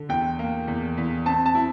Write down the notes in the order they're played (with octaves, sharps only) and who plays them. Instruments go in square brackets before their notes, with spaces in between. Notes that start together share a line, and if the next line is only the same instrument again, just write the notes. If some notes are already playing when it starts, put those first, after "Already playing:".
Already playing: [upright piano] D3
[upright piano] E2 [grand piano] G5
[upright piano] A#3
E2
E2
[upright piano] C4 [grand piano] A5
[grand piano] A5
[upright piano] E4